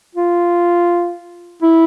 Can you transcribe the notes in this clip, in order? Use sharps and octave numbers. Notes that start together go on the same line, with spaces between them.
F4
E4